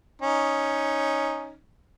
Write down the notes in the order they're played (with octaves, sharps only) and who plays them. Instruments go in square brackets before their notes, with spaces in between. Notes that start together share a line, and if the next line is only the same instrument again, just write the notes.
[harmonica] C#4 D#4